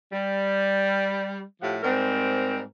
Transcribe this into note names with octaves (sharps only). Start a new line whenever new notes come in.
G3
A2 F3 G4 F#5
G#2 G3 C4 A#4